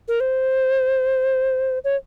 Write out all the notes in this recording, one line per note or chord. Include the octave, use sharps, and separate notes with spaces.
A#4
C5
C#5